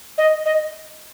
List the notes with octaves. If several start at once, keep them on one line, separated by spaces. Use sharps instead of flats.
D#5
D#5